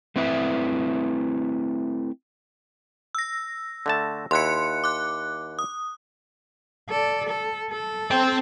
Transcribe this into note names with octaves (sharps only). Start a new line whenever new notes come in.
A3 C4 E4 B4 E5
E6 A#6
D3 A3 A5
D#2 E4 C6 F#6 C#7
D6 F#6
D#6
A4 D5
A4
A4
C4 G5